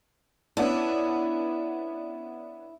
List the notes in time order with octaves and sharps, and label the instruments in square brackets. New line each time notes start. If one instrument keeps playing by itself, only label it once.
[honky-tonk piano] B3 C#4 D4 [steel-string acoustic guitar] E4